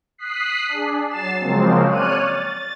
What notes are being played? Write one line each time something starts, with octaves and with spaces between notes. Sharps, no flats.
D#6 F#6 B6 C7
D4 G#4
F#3 A6 C7 E7
C#3 F3 F#3 G#3 A#3 C4
C#5 D5 F6 F#6 D#7
A6